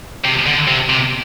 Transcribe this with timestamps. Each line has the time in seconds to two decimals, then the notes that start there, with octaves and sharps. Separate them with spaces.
0.24 C3
0.46 D3
0.67 C3
0.89 C3